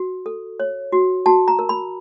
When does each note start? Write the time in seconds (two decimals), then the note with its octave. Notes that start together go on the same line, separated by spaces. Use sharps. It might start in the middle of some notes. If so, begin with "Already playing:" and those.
Already playing: F#4
0.26 A4
0.60 C#5
0.92 F#4
1.26 F#4 A5
1.48 A#5
1.59 A#4
1.69 B5